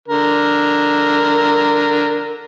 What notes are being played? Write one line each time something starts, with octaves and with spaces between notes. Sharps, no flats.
D3 A#4